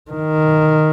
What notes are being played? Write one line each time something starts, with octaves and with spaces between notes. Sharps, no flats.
D#3